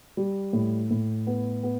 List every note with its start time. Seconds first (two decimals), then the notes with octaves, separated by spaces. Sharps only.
0.17 G3
0.53 A2
0.91 A2
1.27 B3
1.63 B3